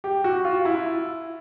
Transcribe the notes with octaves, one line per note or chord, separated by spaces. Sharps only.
G4
F#4
F4
E4